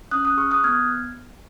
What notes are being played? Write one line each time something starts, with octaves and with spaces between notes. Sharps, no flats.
C#4 D#6 F#6
D#6 F#6
G#4 C#6 F6
D#6 F#6
B3 F6 G#6